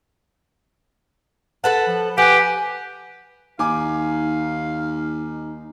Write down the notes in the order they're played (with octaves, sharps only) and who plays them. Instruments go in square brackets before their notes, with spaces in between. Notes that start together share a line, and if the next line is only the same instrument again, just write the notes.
[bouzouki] A4 B4 F#5 [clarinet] A5
[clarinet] F3
[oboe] G4 [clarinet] B4 [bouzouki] F#5 [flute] G#5
[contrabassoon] D#2 [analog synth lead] D#4 [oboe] F5 [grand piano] G#5 D6